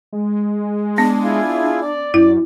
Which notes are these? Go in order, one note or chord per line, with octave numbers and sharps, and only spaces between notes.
G#3
B3 D4
E4 F4 G#4
D5
F#2 E4